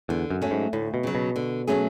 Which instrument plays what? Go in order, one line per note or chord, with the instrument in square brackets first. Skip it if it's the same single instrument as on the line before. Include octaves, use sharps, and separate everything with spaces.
[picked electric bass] E2 [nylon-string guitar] D3
[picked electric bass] F#2
[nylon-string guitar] F#3 A3 C#4
[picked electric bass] G#2
[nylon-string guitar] D2 [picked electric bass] A2
[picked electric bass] B2
[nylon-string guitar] C#3 F#3
[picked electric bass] B2
[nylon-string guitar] D3
F#3 A3 C#4 G#4